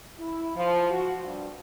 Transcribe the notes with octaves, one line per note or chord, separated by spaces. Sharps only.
E4
F3
F#4
G2